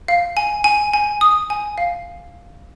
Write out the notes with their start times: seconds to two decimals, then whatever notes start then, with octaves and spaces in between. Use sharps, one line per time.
0.08 F5
0.37 G#5
0.64 G#5
0.93 G#5
1.21 D#6
1.50 G#5
1.78 F5